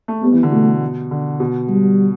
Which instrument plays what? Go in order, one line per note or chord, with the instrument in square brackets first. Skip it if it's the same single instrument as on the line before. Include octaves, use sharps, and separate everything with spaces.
[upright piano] A3
[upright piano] G3 [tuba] B3
[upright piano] E3
D3
[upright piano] B2 [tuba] A3
[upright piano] D3
B2
[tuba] G3